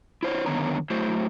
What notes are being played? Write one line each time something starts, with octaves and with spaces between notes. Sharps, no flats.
E4 C5 C#5
F#2 D3 D#3 B3 C#5 A#5
F#3 A3 E4 C5